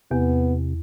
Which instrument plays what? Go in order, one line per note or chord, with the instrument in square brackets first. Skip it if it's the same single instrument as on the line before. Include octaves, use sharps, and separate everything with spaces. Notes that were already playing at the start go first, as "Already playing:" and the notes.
[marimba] E2 [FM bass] C3 [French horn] B3